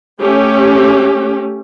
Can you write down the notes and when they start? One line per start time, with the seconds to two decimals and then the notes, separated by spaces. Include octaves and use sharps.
0.20 A3 C#4 G4